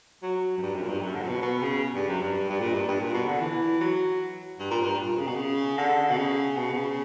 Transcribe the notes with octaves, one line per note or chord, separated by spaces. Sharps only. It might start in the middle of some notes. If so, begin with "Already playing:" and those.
F#3
F#2
G2
F#2
A#2
G2
F#2
D3
A#2
B2
B2
C#3
G2
F#2
G2
G2
A#2
G2
G2
A#2
B2
D3
E3
F#3
G2
A#2
G2
A#2
C#3
B2
C#3
D3
B2
C#3
B2
B2
C#3